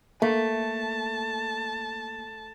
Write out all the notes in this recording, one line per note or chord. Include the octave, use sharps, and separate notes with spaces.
A3 A#3 A5